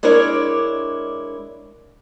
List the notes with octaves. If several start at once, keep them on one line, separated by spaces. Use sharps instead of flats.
G#3 D4 E4 A#4 C#5 D5